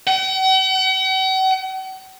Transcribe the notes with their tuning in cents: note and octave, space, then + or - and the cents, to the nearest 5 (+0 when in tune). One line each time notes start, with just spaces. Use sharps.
F#5 +45